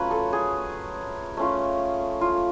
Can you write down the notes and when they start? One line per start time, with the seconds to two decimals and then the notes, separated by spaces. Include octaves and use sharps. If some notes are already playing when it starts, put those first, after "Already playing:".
Already playing: F#3 A3 C#4 F4 B4
0.11 A4
0.33 G#4
1.37 A3 C#4 F4
2.21 F4